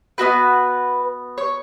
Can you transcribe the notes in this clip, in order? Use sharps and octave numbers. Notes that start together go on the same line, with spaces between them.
B3 D#4 F#4 B4
C#5